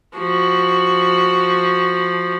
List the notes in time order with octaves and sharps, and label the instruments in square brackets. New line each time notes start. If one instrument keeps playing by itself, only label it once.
[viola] F3 F#4